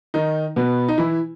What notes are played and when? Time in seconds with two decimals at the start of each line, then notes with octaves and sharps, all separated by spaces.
0.14 D#3 D#4
0.56 B2 B3
0.89 D#4
0.98 E3 E4